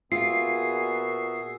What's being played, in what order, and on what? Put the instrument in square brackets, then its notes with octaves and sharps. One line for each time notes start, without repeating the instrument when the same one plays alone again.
[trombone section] A#2 B3 F#4 [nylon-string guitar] F4 [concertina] G#4 E5 [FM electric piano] C7